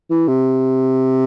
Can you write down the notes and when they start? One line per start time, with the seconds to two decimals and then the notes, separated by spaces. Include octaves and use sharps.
0.10 E3
0.28 C3